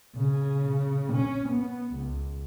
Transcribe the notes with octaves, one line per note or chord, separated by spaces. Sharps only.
C#3
C#4
B3
C#2